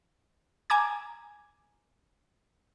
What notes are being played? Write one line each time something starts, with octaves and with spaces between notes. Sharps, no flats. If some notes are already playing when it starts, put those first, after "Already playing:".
G#5 A#5 D6 G#6